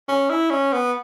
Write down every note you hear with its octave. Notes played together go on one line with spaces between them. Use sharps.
C#4
E4
C#4
B3